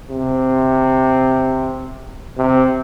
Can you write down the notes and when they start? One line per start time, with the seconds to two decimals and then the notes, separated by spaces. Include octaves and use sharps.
0.10 C3
2.38 C3